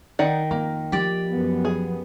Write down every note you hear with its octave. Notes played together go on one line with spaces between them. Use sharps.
D#3 D#4 D5 F#5
F2 A#3
F3 G4 D5
F#2 B3
G#4